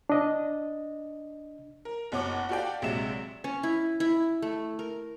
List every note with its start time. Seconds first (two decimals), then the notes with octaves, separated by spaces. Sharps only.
0.10 D4 D#5
1.85 A#4
2.12 F#1 B2 C#5 F#5 D6
2.49 F#4 G4 A4 D5 F5 G5
2.82 A#1 C3 F#3 G#3 E5 E7
3.44 C#4
3.63 E4
4.00 E4
4.42 A3
4.79 A#4